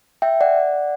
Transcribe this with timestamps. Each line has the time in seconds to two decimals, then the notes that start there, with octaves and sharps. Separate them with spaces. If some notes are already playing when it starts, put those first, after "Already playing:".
0.22 E5 G5
0.41 D5 F#5